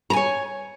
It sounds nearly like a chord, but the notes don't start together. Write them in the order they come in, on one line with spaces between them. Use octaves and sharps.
A#5 G#5 C#5